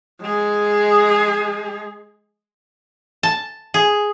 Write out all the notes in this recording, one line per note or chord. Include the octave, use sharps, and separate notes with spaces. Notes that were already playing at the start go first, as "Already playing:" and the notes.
G#3 G#4
A5
G#4